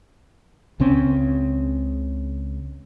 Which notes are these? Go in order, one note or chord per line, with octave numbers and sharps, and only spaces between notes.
C#2 C#3 C4 C#4